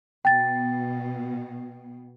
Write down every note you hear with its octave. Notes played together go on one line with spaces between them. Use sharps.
B2 G5 A6